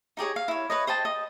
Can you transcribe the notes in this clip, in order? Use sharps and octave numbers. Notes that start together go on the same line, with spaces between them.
D#4 G4 G#4 C#5
F5
E4 C#5
B4 C#5 D#5
C5 D#5 G5 A5
D#5